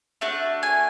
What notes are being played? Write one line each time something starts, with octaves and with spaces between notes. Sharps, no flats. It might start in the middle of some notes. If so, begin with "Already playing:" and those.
A3 D4 F#4 A5
G#5